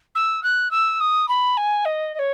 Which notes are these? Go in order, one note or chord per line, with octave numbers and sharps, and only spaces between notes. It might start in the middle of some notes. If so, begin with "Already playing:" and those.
E6
F#6
E6
D#6
B5
G#5
D#5
D#5
C#5